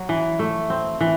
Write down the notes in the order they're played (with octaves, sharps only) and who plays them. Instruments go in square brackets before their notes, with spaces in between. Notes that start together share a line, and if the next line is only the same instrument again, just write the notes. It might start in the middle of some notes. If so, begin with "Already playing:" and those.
Already playing: [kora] F#3
E3
A3
C4
E3